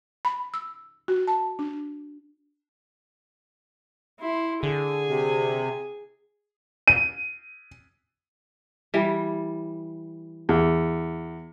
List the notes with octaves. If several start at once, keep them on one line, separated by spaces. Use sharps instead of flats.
B5
E6
F#4
A5
D4
E4 C6
D3 G#4 G#5
C3
D#7
E3 G3
E2